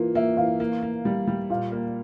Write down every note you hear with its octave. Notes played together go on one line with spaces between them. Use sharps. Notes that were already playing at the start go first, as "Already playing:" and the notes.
Already playing: E3 A#3 F4 A#4
A#3 E5
E3 F5
A#3
A#3
G3
G3
A#2 F5
A#3